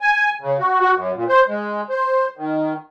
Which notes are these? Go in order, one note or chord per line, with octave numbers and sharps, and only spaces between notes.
G#5
C#3
F#4
F#4
F#2
A#2
C5
G#3
C5
D#3